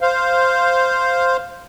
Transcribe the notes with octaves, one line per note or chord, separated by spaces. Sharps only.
C5 F5